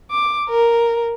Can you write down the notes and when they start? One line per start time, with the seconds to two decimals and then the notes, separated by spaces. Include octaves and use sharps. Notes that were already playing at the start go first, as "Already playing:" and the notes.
0.10 D6
0.49 A#4